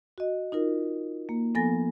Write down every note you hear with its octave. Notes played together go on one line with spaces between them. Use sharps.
F#4 D#5
D#4 F4 A#4
A#3
F3 B3 A4 G#5 A6 A#6